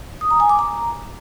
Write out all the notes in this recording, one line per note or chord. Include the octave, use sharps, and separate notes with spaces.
D#6
A#5
G#5
D6
A#5